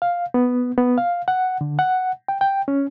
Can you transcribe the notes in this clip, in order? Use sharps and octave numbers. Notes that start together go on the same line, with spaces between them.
F5
B3
B3
F5
F#5
D3
F#5
G5
G5
C#4